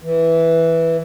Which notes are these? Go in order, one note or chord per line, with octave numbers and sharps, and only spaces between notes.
E3